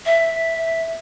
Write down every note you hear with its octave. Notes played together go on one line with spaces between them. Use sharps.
E5